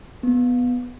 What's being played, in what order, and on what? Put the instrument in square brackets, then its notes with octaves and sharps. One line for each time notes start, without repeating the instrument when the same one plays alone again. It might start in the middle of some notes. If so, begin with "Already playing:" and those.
[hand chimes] B3